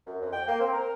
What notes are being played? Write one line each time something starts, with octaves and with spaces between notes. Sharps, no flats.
F#2
F2
G5
A#3
C4
A#4